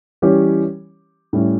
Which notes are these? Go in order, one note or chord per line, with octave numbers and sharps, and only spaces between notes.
E3 G3 C#4 G4 C#5
A2 G3 C#4